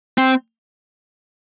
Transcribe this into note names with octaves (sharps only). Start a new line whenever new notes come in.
C4